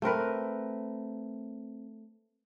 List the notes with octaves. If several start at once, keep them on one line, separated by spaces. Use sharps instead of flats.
A3 C4 A#4 B4